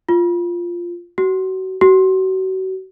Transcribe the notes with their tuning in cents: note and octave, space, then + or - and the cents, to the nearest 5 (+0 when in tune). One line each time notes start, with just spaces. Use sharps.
F4 -5
F#4 +30
F#4 +35